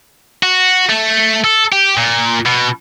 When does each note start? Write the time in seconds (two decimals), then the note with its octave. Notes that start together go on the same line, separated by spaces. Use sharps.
0.43 F#4
0.89 A3
1.44 A4
1.72 G4
1.97 A#2
2.46 B2